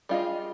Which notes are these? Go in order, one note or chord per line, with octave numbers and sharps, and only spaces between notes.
G3 D4 F4 G#4 D#5